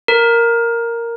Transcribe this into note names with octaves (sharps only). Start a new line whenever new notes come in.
A#4